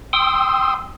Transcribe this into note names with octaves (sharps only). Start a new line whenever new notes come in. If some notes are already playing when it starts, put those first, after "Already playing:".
G5 C6 D#6 E6